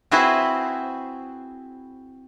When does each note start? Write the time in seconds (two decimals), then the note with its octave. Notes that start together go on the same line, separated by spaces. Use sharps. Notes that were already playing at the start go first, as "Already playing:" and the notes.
0.11 C4 E4 F#4 G#4 B4 C5